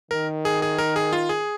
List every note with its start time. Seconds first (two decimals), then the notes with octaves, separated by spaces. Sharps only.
0.11 D#3 A#4
0.45 G#4
0.62 G#4
0.78 A#4
0.96 G#4
1.13 F4
1.29 G#4